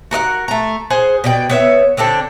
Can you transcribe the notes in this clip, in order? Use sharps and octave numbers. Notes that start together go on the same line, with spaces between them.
F#4 A#4 D#5 F#5
A3 A#5
G#4 C5 F#5
B2 D5 G5
B3 C#5 E5
D3 C4 D4 A4